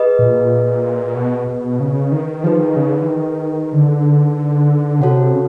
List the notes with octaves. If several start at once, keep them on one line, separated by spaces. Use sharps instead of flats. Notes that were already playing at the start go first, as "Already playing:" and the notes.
Already playing: G#4 B4 D#5
A#2
B2
B2
C#3
D#3
F3 D#4 G#4 B4
D#3
C#3
D3
E3
D#3
D3
C3 F#4 A4 C#5 F#5
C#3